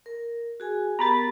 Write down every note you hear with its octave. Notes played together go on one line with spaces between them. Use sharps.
A#4
F#4 G#4 G#5
B3 G4 A#4 A#5 B5 A6